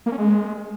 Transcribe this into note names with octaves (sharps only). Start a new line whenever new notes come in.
A#3
C#4
G#3